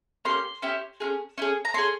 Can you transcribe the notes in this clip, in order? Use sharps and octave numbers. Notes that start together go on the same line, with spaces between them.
A#3 C#4 G4 C6
C#4 E4 G4
C#4 F4 G#4
C#4 E4 G#4
A#5
C#4 F4 G#4 C6